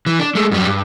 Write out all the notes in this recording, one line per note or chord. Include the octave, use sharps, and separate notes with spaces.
E3
D4
G#3 A3
F#2 G3
G2